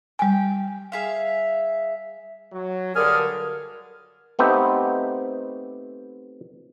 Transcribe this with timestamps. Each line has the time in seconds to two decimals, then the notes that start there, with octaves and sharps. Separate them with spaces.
0.19 G3 G5 G#5
0.92 G#4 E5 F5
2.52 F#3
2.96 G2 D3 G#4 A#4 G#5 F6
4.39 A3 B3 C4 D#4 G4